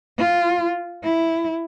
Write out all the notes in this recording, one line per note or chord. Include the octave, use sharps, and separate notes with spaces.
F4
E4